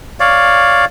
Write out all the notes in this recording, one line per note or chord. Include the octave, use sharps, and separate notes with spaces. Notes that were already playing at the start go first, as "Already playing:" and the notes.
C#5 D5 F5